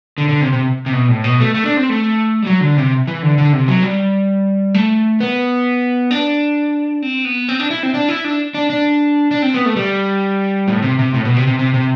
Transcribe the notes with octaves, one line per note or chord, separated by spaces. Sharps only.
D3
D3
C3
C3
C3
B2
A2
B2
A3
A3
D4
C4
A3
G3
F#3
D3
C3
E3
D3
D3
C3
F#3
G3
A3
B3
D4
C4
B3
C4
D4
E4
C4
D4
E4
D4
D4
D4
D4
C4
B3
A3
G3
A2
C3
C3
A2
B2
C3
C3
C3
C3